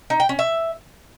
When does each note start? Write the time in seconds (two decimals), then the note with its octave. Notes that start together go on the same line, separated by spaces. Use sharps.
0.10 D#4
0.20 G5
0.29 C#4
0.39 E5